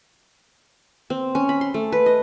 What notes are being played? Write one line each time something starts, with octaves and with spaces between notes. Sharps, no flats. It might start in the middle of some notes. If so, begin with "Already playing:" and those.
C4
C#4
B5
C6
A3
B4
D#5